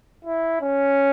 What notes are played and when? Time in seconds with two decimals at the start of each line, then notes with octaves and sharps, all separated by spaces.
0.25 E4
0.61 C#4